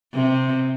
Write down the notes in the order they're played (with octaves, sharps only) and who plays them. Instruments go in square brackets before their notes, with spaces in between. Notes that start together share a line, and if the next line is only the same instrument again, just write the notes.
[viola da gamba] C3